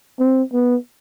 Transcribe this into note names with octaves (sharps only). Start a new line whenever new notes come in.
C4
B3